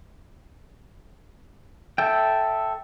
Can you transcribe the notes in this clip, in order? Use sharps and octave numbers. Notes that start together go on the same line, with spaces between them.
A4 E5 G5